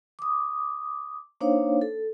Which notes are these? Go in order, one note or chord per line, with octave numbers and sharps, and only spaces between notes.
D6 D#6
A#3 D4 D#4 C5 C#5 F5
A4